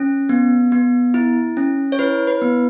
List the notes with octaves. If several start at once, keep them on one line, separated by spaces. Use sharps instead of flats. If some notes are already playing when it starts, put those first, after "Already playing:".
Already playing: C#4
B3
B3
E4
C#4
C#5
E4 B4
B4
B3